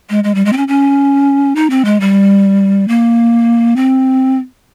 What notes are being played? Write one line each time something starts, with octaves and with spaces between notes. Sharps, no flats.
G#3
G#3
G3
G#3
C4
C#4
C#4
D#4
C4
G#3
G3
A#3
C4